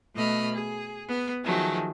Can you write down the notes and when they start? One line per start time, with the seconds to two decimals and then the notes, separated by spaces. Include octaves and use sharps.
0.14 B2 A3 D#5 B5 F6
0.54 G#4
1.08 B3
1.44 D#3 F3 F#3 G#3 A3